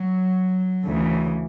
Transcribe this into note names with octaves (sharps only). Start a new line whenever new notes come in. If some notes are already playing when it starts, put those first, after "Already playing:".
Already playing: F#3
D2 C#3 E3